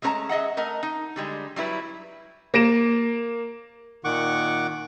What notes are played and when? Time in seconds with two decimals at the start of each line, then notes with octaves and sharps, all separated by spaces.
0.02 G#3 A3 C#4 A#4 A5 A#5
0.29 G#4 D#5 E5 F#5
0.57 A3 A#4 D#5 F#5
0.83 D#4
1.16 D3 G3 G#3
1.56 F#3 G3 E4 B4
2.54 A#3 A#6 D7 E7
4.04 A#2 D#3 F#5 C#6 D6